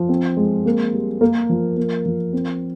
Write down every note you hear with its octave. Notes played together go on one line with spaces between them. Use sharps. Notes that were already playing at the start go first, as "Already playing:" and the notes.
Already playing: F3
C4
G#3
A#3
G3
A#3 A#4
F3
A#3
F3
C4